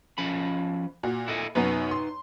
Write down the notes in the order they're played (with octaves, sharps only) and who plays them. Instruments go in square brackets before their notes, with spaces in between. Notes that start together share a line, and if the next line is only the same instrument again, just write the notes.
[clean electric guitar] F3 C#4 B5
[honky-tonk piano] A#2 F#4
[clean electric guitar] E4 A4 D#5
[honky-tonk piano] F#2 B3 [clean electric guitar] D#4 B4
[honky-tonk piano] C6